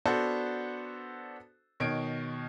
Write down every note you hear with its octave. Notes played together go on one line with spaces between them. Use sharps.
B3 D4 F#4 A4 C5
B2 D#3 C#5 D7